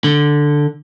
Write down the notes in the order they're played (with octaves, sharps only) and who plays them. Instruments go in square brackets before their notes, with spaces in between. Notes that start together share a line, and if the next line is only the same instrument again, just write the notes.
[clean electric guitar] D3